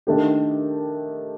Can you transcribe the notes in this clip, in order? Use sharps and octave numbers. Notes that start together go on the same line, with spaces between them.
D#3 A3 D4 G4